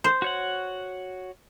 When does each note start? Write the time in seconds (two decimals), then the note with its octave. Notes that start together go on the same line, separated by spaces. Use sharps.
0.04 C5
0.22 F#4 C#5 F#5